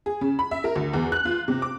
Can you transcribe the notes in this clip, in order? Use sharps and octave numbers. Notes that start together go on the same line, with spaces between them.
G#4
C#3
B5
E5
A#4
D2
E2
F#6
F4
C3
D6